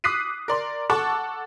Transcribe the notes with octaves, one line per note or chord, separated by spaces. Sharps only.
D6 D#6 F#6 B6 C7 D#7
A#4 D5 C6
A4 F#5 A5 C#6 D6